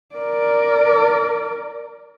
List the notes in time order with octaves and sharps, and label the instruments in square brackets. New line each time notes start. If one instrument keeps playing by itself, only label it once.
[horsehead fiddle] A#4 D5